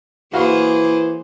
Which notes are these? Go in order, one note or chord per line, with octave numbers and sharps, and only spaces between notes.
E3 A#3 F#4 G#4 C5 F5